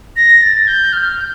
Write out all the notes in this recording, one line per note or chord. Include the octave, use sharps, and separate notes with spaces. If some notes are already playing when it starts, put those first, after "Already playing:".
A#6
A6
G6
F6
G6